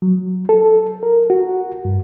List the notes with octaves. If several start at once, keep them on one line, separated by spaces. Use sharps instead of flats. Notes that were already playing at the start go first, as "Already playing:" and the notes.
F#3
A4
A#4
F#4
G2